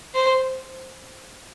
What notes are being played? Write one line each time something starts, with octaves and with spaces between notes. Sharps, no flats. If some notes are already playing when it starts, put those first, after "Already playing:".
C5